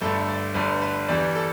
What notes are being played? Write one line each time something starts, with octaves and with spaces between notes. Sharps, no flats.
G1 G2 D3 A3 A4
D5
G1 G2 D3 A3 B4
B4
E2 E3 G3 D5
A4